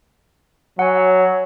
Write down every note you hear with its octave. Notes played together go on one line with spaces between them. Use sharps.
F#3 F#5 G#5